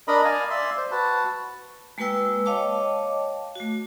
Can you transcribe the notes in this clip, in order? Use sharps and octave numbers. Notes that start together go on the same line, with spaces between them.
D4 A#4 D#5 B5
D5 F5 G#5
D5 E5 C6
C5
F#4 B4 A5
G#3 A#3 F#4 B4 G5 E6
C#5 D#5 F5 G5 A5 D6
A3 F#4